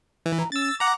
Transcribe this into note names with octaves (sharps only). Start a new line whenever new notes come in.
E3
A#5
C#4 E6 A6
F#5 A#5 D6